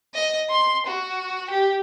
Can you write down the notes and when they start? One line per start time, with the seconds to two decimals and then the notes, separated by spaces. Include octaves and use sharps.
0.14 D#5
0.50 C6
0.87 F#4
1.50 G4